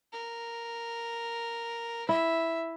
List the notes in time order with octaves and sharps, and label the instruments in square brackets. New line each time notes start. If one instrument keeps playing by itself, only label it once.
[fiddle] A#4
[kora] E4 [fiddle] E5